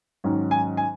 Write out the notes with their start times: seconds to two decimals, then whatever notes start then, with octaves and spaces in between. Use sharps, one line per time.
0.24 G#2 D#3 F#3 C#4
0.51 G#5
0.77 G#5